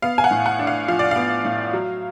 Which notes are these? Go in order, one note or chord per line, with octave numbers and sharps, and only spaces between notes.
B3 F5
G#5
F#5
A2
F#5
D4
F5
F3 F5
D5
B3 F5
A2
F#3